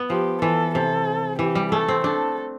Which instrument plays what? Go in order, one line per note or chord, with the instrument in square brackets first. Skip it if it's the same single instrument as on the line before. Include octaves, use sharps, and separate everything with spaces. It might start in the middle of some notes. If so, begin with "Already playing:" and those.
Already playing: [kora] B3
[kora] F3 [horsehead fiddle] G4
[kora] E3 [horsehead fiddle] A4
[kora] C3 [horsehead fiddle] A4
[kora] E3 [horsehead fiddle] G4
[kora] G3
[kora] A3 [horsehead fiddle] A4
[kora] C4
[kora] D4 [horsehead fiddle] A4